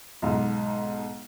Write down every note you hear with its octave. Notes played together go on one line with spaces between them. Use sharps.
B1 G#2